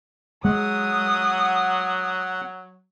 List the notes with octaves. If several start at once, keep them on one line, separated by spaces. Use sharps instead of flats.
F#3 G#3 F#5 D#6